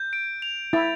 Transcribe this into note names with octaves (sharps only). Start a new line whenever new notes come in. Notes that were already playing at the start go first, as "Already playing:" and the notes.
Already playing: G6
D7
F7
E4 A6